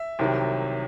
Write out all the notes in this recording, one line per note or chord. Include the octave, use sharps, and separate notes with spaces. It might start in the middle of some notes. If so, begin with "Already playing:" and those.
Already playing: E5
C2 C3 D#3 F#3